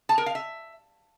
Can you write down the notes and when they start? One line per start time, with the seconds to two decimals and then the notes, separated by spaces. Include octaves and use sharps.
0.09 A5
0.18 A#4
0.26 F5
0.35 E5